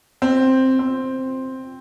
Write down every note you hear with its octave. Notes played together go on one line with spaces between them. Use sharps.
C4
C4